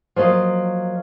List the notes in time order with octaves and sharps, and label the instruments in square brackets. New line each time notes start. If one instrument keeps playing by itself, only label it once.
[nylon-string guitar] F3 F#3 A#3 D#5 F5